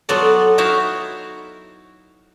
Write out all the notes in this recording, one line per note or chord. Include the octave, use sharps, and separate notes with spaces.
F#3 B3 F4 A4 D5
D#4 E4 F#4 E5 F5